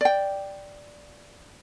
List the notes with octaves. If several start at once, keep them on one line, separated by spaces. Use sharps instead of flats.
D5 G5